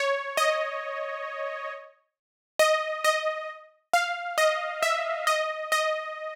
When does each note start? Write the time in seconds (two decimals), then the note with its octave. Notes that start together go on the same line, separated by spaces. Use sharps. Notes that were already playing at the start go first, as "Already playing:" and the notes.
Already playing: C#5
0.37 D#5
2.59 D#5
3.04 D#5
3.93 F5
4.38 D#5
4.83 E5
5.27 D#5
5.72 D#5